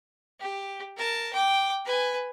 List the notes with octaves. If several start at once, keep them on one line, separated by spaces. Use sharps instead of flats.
G4
A#4 A5
G5 D6
B4 G#5